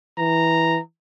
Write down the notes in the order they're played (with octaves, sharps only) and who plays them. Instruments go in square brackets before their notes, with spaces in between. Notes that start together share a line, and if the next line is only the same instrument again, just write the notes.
[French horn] E3 [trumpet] A#5